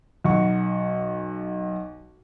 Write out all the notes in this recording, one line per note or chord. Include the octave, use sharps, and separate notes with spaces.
B1 F#5 C#6